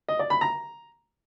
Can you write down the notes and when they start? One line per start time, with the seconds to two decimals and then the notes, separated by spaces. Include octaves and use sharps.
0.08 D#5
0.19 D5
0.30 B5
0.41 A#5